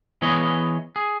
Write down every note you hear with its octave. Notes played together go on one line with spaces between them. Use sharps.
E3 B3 G#4 C#5 D#5
G#4